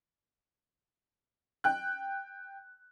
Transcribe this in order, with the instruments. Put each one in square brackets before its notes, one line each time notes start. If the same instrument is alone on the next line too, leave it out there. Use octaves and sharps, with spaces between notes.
[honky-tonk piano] G5 F#6